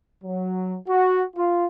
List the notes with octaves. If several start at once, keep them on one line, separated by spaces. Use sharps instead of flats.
F#3
F#4
F4